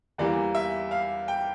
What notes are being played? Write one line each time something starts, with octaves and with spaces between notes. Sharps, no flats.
E2 E3 G3 A#3 D5
E5
F5
G5